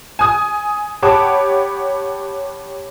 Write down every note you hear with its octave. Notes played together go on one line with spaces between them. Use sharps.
G#5 D#6
G4 C#5 F#5 A5 B5 D6